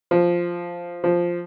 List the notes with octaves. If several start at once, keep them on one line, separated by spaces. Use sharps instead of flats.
F3
F3